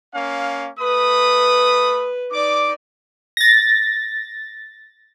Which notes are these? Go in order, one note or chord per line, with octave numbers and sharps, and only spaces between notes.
A#3 C#4 F5
A3 B4 B5 D#6
D#4 D5 D6
A6 A#6